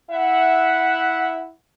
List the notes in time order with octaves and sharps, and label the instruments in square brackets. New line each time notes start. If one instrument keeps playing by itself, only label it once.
[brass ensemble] E4 E5 F#5